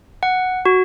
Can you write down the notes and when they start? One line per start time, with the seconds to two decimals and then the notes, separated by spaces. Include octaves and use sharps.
0.23 F#5
0.66 F#4